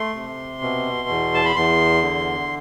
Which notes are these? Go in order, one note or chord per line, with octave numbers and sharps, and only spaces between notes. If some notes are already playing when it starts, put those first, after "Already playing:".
Already playing: A3 C6
C3
B2
E2
A5
B5
E2 C6
D3